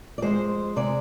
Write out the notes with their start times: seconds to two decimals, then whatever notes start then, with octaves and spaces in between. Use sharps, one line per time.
0.18 D5
0.22 F2 C3 G#3 C5
0.76 C3 G#3 D5